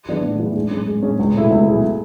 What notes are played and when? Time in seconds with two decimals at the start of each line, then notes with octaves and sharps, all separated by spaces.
0.08 E3 B3 D4 G#4
0.24 A2
0.39 E3 B3 D4 G#4
0.55 G#3
0.71 C#4 G#4
0.87 G#3
1.02 C#4 G#4
1.19 C#2
1.34 B2 A3 E4 G#4
1.51 C#2
1.66 B2 A3 E4 G#4